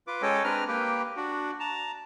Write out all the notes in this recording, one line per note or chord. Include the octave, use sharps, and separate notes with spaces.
F4 B4 D6
G#3 C#4 A4 C#5 D#5 G5
G#3 C4 D4 B4 A#5 F6
A#3 G4 B4 G5
D4 F#4
A5 A#5